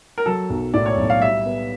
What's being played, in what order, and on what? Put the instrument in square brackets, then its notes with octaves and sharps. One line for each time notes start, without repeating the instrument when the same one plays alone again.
[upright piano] A#4
[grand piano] F#3 [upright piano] A4
[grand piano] B1
[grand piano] A2 [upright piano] D5
[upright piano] C#5
[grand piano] B1
[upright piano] F5
[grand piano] G3 [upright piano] E5
[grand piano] B3